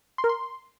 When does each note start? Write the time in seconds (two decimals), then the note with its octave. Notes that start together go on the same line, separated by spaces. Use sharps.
0.18 C6
0.24 A#4
0.29 C6